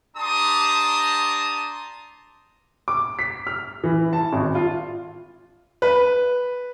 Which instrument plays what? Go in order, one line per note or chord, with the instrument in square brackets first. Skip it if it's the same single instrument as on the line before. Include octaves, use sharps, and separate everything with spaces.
[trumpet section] D4 G4 A5 A#5 C6 D#6
[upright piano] D6
B6
F6
E3
A5
G#1
F4
[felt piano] B4